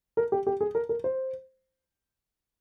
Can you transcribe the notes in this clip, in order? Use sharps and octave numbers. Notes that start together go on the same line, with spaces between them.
A#4
G4
G4
G#4
A#4
A#4
C5